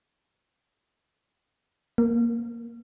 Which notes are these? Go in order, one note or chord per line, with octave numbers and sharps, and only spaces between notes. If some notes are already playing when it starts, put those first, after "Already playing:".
A#3